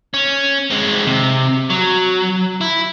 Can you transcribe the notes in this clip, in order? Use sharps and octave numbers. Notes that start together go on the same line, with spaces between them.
C#4
G#3 C4
C3
F#3
E4